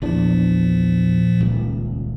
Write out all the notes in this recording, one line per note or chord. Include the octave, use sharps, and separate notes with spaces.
A#1 E2 A#2 F3 D4
D#1 C#2